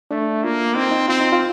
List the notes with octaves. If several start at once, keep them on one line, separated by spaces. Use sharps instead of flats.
A3 D4
A#3 F4
C4 D#4
D#4
C4 F4
D#4
F4